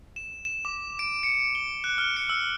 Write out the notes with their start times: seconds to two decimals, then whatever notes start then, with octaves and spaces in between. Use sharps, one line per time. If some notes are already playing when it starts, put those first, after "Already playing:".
0.16 E7
0.45 E7
0.65 D6
0.99 D7
1.23 C#7
1.55 G7
1.84 F#6
1.98 F6
2.17 C#7
2.29 E6